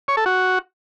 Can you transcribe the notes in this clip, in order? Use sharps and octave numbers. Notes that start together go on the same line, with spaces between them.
C#5
A4
F#4